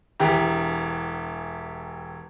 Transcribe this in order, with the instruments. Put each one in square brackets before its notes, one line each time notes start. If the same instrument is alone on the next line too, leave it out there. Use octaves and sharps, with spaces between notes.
[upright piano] E1 E3 G4 A#5